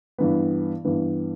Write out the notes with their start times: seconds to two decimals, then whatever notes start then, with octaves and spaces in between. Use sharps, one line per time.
0.18 G2 E3 B3
0.84 G2 E3 B3